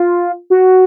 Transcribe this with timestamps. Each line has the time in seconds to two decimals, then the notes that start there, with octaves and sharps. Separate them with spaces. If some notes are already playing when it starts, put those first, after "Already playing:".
Already playing: F4
0.50 F#4